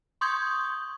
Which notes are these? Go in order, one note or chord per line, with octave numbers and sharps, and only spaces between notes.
C6 C#6 D#6 G6 G#6